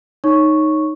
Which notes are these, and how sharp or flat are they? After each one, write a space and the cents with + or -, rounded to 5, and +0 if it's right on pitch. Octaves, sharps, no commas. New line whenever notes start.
D#4 +0 C#5 +0 C#6 +0